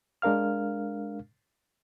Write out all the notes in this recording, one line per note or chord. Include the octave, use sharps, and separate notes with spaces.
G#3 D4 A#4 F5 F6